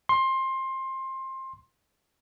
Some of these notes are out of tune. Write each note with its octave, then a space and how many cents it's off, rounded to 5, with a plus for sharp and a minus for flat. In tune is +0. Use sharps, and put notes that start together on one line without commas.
C6 +20